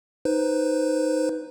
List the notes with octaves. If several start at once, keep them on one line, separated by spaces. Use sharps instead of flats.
D#4 B4 C5